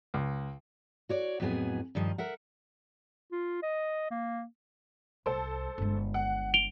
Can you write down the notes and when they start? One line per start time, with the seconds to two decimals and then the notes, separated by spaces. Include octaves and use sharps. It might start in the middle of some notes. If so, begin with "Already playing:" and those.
0.14 C#2
1.09 F#4 C#5 D5
1.40 F2 A2 F#3 B3 G#4 G#5
1.95 G2 D#3 F3 D#5
2.18 A#4 E5 F#5
3.32 F4
3.63 D#5
4.11 A#3
5.26 C2 A4 C5
5.78 G1 G#3
6.14 F#5
6.54 D7 F7 G7